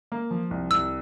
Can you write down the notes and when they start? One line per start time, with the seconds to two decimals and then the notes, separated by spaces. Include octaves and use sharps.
0.12 A#3
0.31 F3
0.51 C2
0.70 C2 E6